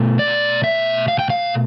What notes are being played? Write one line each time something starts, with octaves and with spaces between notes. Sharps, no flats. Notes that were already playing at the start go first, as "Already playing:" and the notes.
Already playing: B2 A3
D5
E5
F5
G5
F5